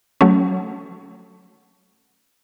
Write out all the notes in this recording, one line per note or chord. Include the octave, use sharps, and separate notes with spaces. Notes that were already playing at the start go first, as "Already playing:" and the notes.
F#3 A3 C#4